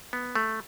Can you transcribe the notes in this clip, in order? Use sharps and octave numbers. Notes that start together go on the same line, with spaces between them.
B3
A3